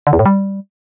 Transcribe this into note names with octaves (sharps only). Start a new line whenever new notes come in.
D3
E2
A2
G3